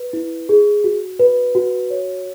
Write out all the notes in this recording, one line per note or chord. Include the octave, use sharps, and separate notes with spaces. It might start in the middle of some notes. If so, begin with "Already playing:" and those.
Already playing: B4
E4
G#4
F#4
B4
F#4
C#5